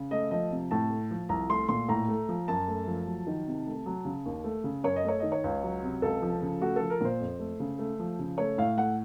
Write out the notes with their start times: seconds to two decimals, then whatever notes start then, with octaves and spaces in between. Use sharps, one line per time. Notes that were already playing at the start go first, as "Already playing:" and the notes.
Already playing: C#3
0.11 A3 D#5
0.31 F3 D#5
0.51 C3
0.71 A2 A5
0.90 A3
1.11 F3
1.29 C2 A#5
1.49 A3 C6
1.69 A#2 C6
1.89 A2 A#5
2.08 A3
2.29 F3
2.48 F#2 A5
2.68 A3
2.87 F3
3.06 F#3
3.27 D#3
3.47 C3
3.67 A3
3.86 F#3
4.05 C#3
4.26 D#2
4.44 A3
4.64 C#3
4.83 F#2 C#5
4.96 D#5
5.04 A3 C#5
5.20 D#3 D#5
5.32 C#5
5.44 C#2
5.63 F#3
5.83 C3
6.02 C#2 A4
6.22 F3
6.42 C#3
6.61 A3 F#4
6.76 F3 A4
6.90 A#4
7.01 A#2 C5
7.20 F2
7.39 A3
7.60 C#3
7.79 A3
7.99 F3
8.19 C#3
8.38 A3 C#5
8.58 A2 F5
8.77 A3 F#5